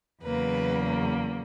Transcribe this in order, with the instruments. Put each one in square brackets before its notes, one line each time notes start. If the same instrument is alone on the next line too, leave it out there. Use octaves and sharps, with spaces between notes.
[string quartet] E2 C#3 F#3 A#3 B4